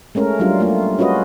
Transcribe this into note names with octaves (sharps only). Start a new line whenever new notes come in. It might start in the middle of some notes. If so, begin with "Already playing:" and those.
G#3 A3 C#4 A#4
F#3 G3 C#4 D4 F4
A3 A#3 F4
C#4 F4 F#4 B4 D#5